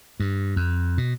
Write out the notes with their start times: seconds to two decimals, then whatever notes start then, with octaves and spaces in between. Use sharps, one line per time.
0.20 G2
0.56 F2
0.98 B2